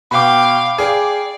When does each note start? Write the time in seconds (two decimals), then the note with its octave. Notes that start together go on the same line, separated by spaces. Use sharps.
0.11 B2 F5 G5 B5 D6
0.78 G#4 D5 F5 G5